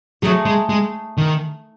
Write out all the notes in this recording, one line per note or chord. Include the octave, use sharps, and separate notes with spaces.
F#3 A3 D#4 G#4
G#3
G#3
D#3